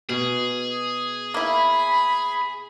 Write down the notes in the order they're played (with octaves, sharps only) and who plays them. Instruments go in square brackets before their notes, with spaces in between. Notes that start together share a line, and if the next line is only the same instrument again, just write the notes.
[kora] B2 [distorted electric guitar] G#4
[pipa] A#3 E4 [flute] B5